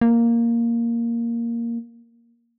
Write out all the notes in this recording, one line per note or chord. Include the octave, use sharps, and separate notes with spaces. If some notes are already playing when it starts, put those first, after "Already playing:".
A#3